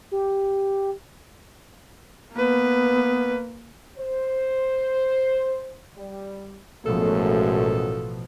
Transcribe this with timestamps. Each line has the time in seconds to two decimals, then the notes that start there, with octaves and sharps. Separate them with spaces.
0.12 G4
2.32 A#3 B3 B4
3.98 C5
5.96 G3
6.86 A1 F#2 B2 F3 F#3 G#3 A3 A4